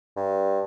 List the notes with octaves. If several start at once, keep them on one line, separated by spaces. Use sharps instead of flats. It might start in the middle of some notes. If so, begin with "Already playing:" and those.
G2